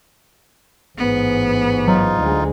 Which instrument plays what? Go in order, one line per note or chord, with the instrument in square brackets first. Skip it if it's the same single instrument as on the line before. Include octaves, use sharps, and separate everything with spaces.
[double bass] A1 G#2 [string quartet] B3
[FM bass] F#3 [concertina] D#4 F4
[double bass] D2 G#3